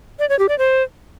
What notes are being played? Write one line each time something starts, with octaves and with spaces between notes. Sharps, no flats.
D5
C#5
G4
D5
C5